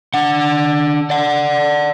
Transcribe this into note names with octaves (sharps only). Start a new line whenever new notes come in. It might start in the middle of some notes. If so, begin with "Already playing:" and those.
D4 F#5
D5 F#5